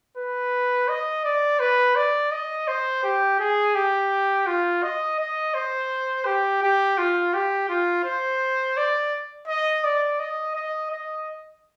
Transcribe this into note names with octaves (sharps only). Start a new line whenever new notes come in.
B4
D#5
D5
B4
D5
D#5
C5
G4
G#4
G4
F4
D#5
D#5
C5
G4
G4
F4
G4
F4
C5
D5
D#5
D5
D#5
D#5
D#5